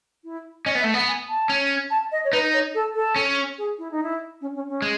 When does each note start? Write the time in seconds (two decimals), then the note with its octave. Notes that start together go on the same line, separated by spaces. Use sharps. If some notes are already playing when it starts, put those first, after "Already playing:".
0.24 E4
0.65 C#4 D#5
0.75 B3
0.79 E5
0.84 A3
0.94 B3 F#5
1.07 G#5
1.29 A5
1.49 C#4
1.90 A5
2.11 D#5
2.24 C#5
2.32 D#4 B4
2.53 C#5
2.74 A4
2.94 A4
3.16 C#4
3.58 G#4
3.78 E4
3.91 D#4
4.03 E4
4.41 C#4
4.54 C#4
4.69 C#4
4.82 G#3